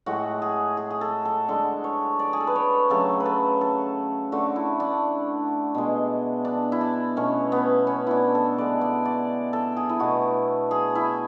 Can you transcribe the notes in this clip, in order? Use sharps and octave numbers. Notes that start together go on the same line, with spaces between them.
A2 G#3 F#4
G#4
G#4
G#4
A4
A4
D3 G#3 A4
C#5
D5
G#4
A4
B4
C#5
C#3 F#3 A3 A4
B4
A4
A4
D3 A3 F#4
E4
D4
B2 G#3
D4
E4
D4
B2 A3 C#4
B3
C#4
D4 E4
A4
D3 G#3 D5
D5
D5
A4
G#4
E4
B2 A3 F#4
G#4
E4